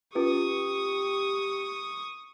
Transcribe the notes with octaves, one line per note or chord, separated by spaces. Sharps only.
C#4 F4 G4 B4 C#6 D#6